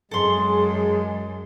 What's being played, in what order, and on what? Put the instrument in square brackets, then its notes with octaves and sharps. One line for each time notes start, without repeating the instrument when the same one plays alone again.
[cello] F#2 [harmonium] G#3 [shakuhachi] G#4 [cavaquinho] A4 C6